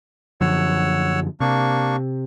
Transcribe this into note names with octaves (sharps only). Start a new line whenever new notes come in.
F#2 D3 F3 C#5 F#5 E6
C3 A#3 D4 C#6